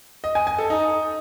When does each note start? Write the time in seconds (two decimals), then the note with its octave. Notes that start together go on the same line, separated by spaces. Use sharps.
0.24 D#5
0.35 G#5
0.47 G#5
0.58 A4
0.70 D#4